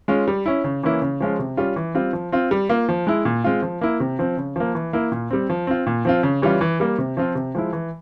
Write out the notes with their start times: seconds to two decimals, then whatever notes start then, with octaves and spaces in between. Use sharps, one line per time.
0.08 G#3 C#4 F4
0.28 G3
0.46 C#4 E4
0.64 C#3
0.83 E3 A#3 C#4 E4
1.02 C#3
1.20 F3 G#3 C#4 F4
1.39 C3
1.57 G3 C#4 F4
1.76 E3
1.95 G3 C4 F4
2.13 F3
2.32 C4 F4
2.51 G3
2.69 A#3 F4
2.89 F3
3.07 G#3 E4
3.25 A#2
3.44 G#3 C4 F4
3.62 F3
3.81 A#3 E4
4.00 C3
4.19 F3 C4
4.37 C#3
4.56 F3 A#3
4.75 E3
4.93 A#3 E4
5.12 A#2
5.31 G3 C4
5.50 F3
5.67 C4 F4
5.86 A#2
6.05 F3 C4 F4
6.23 C#3
6.42 E3 G3 C#4 F4
6.61 E3
6.80 G3 A#3
6.98 C3
7.17 F3 C4 F4
7.35 C3
7.55 F3 G#3 E4
7.73 E3